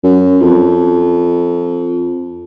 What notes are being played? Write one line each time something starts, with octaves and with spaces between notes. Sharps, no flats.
F#2
F2